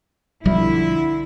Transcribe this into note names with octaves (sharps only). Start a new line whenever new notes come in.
B1 D3 F3 G3 E4